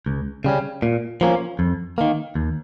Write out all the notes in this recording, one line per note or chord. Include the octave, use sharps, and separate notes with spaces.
C#2
C#3 G3 C#4
A#2
F3 A#3 C#4
F2
D#3 A#3
D#2